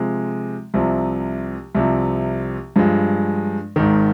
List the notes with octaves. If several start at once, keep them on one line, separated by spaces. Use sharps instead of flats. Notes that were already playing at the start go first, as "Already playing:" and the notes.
Already playing: C3 F3 G#3
C2 C3 F3
C2 C3 F3
G2 F3 G#3
G#1 G#2 D#3